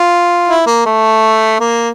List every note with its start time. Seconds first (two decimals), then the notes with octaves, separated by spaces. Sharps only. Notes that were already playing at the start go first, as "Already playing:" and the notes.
Already playing: F4
0.48 E4
0.66 A#3
0.85 A3
1.60 A#3